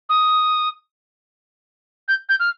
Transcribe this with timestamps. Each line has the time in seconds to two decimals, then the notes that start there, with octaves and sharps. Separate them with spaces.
0.09 D#6
2.08 G6
2.29 G6
2.40 F6